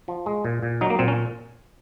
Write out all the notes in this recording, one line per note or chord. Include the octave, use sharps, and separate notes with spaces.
F3
G#3
A#2
A#2
F#3 D#4
A#3
A#2 C4
C#4